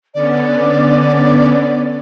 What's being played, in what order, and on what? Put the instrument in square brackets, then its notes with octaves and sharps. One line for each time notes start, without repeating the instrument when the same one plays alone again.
[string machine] D3 B3 C#4 [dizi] D5